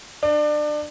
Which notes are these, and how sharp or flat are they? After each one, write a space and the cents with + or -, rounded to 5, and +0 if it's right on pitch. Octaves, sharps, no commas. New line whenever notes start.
D4 +30